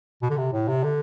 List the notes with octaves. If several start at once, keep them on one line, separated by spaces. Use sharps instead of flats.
B2
D3
C3
A2
C3
D3